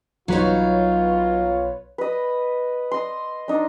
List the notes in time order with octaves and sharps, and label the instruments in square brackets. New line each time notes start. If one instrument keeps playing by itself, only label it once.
[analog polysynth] B1 B4 C#5 [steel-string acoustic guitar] F#3 D#4 [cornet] F4
[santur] B4 D#5
D#5 C6
D4 D#4 D#5